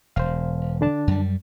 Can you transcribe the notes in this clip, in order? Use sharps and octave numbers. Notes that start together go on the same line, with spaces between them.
E1 C5 F5
D3 D4 A5
F#2 G3